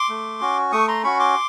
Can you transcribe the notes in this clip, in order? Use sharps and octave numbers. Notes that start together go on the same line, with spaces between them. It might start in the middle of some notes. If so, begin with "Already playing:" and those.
Already playing: C6 D6
A3
C#4 F#4
A3 C#6 D#6
A#5 C6
C#4 F#4 B5 C#6
C6 D6